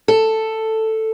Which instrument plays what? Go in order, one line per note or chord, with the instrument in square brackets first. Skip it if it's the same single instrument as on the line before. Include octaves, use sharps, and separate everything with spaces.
[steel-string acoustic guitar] A4